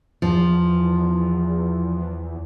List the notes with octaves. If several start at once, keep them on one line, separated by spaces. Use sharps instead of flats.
E2 F3